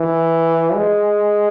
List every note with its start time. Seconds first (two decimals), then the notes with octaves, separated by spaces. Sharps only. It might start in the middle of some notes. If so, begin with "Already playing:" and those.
Already playing: E3
0.74 G#3